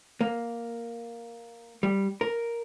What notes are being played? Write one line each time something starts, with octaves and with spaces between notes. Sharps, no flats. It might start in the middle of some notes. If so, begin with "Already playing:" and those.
A#3
G3
A#4